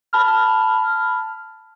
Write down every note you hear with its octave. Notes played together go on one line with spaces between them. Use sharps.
A5 B5 F6